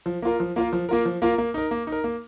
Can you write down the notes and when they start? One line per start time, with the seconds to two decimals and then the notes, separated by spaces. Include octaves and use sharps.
0.06 F3
0.22 A#3 F4 A#4
0.40 F3
0.56 A#3 F4 A#4
0.73 F3
0.89 A#3 F4 A#4
1.05 F3
1.22 A#3 F4 A#4
1.38 A#3
1.54 D#4 A#4
1.71 A#3
1.87 D#4
1.92 A#4
2.04 A#3